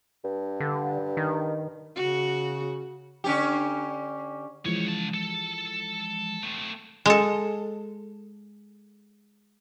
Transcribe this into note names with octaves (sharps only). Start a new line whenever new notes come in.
G2
D3
D#3
C#3 F#4
D3 C#4 G4
C#2 E3 F3 G#3 C#5
C#3 A5
A4
A3 C4
G#3 A4